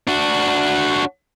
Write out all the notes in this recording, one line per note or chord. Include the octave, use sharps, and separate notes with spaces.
D4 F#4